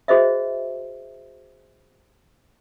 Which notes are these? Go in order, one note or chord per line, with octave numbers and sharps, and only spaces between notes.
F#4 G#4 C5 D#5 E5